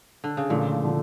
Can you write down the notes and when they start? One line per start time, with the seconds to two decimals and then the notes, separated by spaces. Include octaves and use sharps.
0.24 D3
0.37 C#3
0.50 A#2 D3 F3 A3
0.84 D3 F3 A3